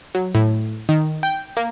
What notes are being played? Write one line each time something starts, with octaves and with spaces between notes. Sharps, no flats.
F#3
A2
D#3
G5
A#3